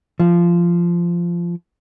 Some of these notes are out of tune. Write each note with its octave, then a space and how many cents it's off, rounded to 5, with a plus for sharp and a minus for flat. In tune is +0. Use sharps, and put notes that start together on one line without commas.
F3 -15